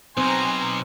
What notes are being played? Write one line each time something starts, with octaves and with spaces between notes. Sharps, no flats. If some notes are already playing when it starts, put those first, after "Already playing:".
B1 B2 C4 C5 G#5 A#5 C6